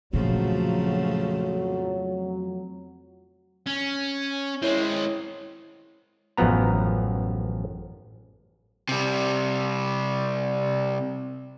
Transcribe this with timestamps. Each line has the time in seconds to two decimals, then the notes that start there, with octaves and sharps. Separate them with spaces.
0.13 F2 A#2 C#3 F3 F#3 A3
3.66 C#4
4.62 G#3 C4 E4 C#5
6.37 A1 F#2 F3 B3 A#5
8.89 C3 G3